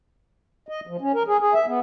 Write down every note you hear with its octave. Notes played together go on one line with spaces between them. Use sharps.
D#5
F3
C#4
A#4
G#4
G#4
E5
B3